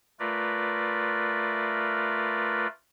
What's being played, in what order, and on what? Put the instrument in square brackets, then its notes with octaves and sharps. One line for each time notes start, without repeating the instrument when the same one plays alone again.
[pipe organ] A3 F4 A#4 B4 D5